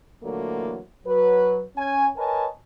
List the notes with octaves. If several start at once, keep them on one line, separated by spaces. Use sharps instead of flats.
A#2 D3 E3 F#3 A3 A#3
F#3 B4
C#4 G#5
A#4 B4 C#5 D#5 G#5 A5